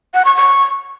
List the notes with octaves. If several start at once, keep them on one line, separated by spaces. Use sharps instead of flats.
F#5
C#6
C#6